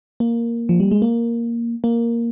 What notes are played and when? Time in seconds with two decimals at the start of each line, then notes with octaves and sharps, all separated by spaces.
0.20 A#3
0.69 F3
0.80 G3
0.91 G#3
1.02 A#3
1.84 A#3